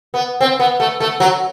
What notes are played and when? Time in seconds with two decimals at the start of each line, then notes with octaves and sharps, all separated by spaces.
0.14 B3
0.41 C4
0.60 B3
0.80 A3
1.00 A3
1.20 F#3